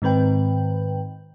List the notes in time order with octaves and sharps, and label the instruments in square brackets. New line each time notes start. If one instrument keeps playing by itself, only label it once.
[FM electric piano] G#2 D#3 C4 B4 G5